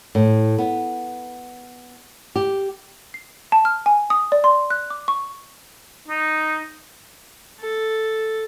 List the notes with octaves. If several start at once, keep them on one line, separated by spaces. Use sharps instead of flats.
A2
B3
G4
C7
A5
F6
G#5
D#6
D5
C6
F#6
D6
C#6
D#4
A4